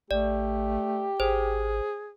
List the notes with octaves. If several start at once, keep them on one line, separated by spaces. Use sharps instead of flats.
A1 A3 G4 D5
G#1 G#4 C5